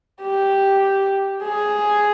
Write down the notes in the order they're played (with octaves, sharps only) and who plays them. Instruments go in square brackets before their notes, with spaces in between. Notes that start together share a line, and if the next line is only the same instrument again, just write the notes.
[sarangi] G4
G#4